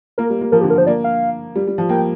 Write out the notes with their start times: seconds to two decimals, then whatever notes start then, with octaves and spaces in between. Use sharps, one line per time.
0.18 A#3 A#4
0.30 G3
0.41 A#3
0.52 F3 A#4
0.61 G4
0.64 D3
0.70 A#4
0.76 F3 C5
0.87 A#3 D5
1.04 F5
1.55 G3
1.67 G3
1.78 F3
1.89 A#3 G5